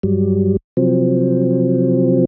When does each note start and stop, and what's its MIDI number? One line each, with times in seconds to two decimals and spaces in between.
0.03 0.57 43
0.03 0.57 54
0.03 0.57 55
0.77 2.25 48
0.77 2.25 53
0.77 2.25 54
0.77 2.25 60